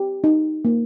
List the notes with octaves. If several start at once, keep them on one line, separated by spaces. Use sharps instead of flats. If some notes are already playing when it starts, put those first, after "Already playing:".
Already playing: G4
D#4
A#3